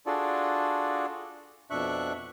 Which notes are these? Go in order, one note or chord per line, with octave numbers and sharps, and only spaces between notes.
D4 F4 F#4 G#4 A4 D5
F2 B2 D4 E5 C#6 F#6